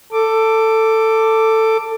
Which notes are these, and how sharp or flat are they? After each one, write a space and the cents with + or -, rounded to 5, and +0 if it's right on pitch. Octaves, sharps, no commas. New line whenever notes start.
A4 +15 D6 +0